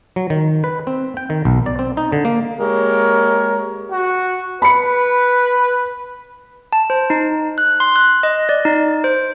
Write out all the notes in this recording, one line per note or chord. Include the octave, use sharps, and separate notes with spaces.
F#3
D#3
B4
C4
G5
D#3
B1
D5
C4
D#4
D3
A#3
G#3 A#3 G4 A#4 C#5
F#4
B4 B5 C#7
A5
C5
D#4
F#6
C6
F#6
D#5
D5
D#4
C5